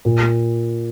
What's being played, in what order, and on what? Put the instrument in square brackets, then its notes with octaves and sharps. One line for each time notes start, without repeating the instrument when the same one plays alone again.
[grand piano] A#2